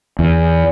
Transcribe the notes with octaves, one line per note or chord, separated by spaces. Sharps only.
E2